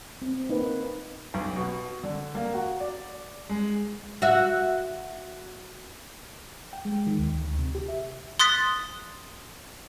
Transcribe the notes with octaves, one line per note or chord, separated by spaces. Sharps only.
C4
A#3 D#4 B4
B1
B2
D3
A#3
F#4
D5
G#3
F#4 E5
G5
G#3
D#3
D#2
D2
D2
C3
G4
E5
C6 D#6 F#6 A6 B6